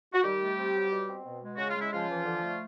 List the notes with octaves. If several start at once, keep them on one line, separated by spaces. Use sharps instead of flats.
F#4
D#3 G3 G4
A3
C4
F#3
B2
C4
B2
G#3
C#3 F#4
F4
G#3
E4
C#3 F3 F4
E3
D3
A3